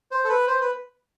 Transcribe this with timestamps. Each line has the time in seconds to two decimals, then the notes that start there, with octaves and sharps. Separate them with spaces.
0.11 C5
0.24 A4
0.29 B4
0.47 C5
0.61 B4